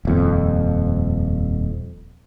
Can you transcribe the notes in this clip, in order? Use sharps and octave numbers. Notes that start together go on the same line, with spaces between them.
D#1 F2